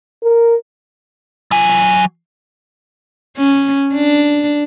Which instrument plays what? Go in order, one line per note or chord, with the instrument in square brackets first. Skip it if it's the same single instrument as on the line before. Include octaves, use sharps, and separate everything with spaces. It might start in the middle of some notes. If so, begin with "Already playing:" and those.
[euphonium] A#4
[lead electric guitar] F#3 G#5
[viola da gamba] C#4
D4